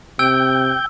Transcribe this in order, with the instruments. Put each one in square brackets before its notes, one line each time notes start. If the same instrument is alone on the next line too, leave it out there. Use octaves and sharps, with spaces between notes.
[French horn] C3 [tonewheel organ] G5 G6 [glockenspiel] E6